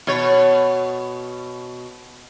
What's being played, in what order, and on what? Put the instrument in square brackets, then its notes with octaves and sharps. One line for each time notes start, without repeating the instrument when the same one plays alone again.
[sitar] B2 C#5